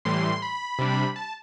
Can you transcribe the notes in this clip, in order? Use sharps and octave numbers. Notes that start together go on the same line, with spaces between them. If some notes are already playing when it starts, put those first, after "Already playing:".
A2 E3 G3 C6
B5
C3 G3 D4
A5